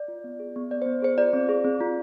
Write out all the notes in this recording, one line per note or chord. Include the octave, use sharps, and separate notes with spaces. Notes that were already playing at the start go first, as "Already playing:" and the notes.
Already playing: D5
F4
B3
G#4
B3
B3 D5
B3 C5
G#4 C5
F4 D5
C4
G#4
C4
F4